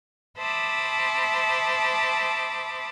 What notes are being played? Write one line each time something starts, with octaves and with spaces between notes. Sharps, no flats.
C5 E5 A5 B5 D6 D#6